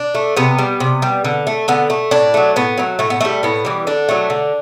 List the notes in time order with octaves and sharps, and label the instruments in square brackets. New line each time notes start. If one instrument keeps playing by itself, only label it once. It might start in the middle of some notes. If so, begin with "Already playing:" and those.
Already playing: [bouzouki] D4
A3
C3 B3
G3
C3
G3
D3
A3
D3 B3
A3
A2 D4
F#3 A3
A2 B3
F#3 A3
A2 A3
B3
E3 A3
G3
A2 B3
E3 G3
D3 D4
F#3 A3
D3